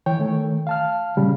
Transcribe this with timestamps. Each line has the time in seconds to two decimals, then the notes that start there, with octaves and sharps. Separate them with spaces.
0.06 E3 C#5 G5
0.19 D#3 A3
0.67 F5 A5 F6
1.17 A#2 C#3 G3